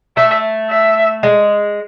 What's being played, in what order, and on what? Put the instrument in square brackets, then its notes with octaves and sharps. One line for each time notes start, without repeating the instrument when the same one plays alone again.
[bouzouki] A3 [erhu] E5
[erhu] E5
[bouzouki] G#3